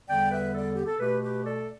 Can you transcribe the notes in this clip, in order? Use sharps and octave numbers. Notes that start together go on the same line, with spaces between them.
E2 D3 G3 B3 D5 G5
B4 E5
A4 D5
G4
A4
B2 A3 G4 B4
G4 B4
A4 D5